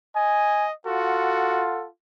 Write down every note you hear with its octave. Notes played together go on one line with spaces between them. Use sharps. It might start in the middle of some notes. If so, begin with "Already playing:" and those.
D#5 G#5
F4 F#4 A4 F#5